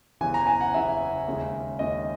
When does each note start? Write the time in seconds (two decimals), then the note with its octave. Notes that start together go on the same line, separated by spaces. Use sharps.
0.21 F#1 E2 C#3 E3 G#5
0.34 A#5
0.47 G#5
0.61 F#5
0.74 F#1 E2 C#3 E3 E5
1.26 D#2 C#3 G#3
1.79 D#2 C#3 G#3 D#5